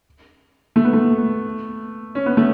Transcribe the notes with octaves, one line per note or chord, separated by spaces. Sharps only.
A3
B3
A3
C#4
B3
A3